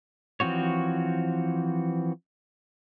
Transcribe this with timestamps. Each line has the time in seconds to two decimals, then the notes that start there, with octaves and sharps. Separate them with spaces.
0.40 E3 F3 C4 F#4 C#5